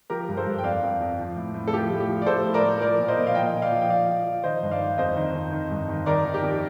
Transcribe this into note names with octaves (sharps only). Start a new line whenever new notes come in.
F3 G4 A#4
G2
A4 C5
G2
G5
F2 D5 F5
F2
F2
F3
A2
A2
A4
F3 G4
A2
G4
F3
D5
A2 A4 C5
A2
A#4 D5
A2
F3 A#4 D5
A#2
C5 D#5
A#2
F5
F3 D#5 G5
F3
D5 F5
F3
G5
F3 D5 F5
F3
F3
D#3 C5 D#5
G2
D5 F5
D#3
F2 C5 D#5
D#3
F2
D#3
G2
D#3
D#3 A#4 D5
D#3
G4
F2